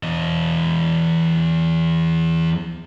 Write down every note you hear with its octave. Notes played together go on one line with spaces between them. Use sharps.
E2 D#5